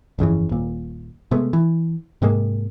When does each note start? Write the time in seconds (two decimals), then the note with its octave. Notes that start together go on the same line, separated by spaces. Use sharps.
0.19 G1 F2 C#3 E3
0.49 D#1 A#2
1.31 C3 G#3 A3 B3
1.53 E3
2.22 G#2 C3 G#3 A#3